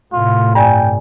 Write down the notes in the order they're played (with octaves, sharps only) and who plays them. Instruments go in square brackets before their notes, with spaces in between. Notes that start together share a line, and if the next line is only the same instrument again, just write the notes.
[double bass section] A2 C3 [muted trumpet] F4
[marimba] G2 D5 G#5 [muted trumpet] G5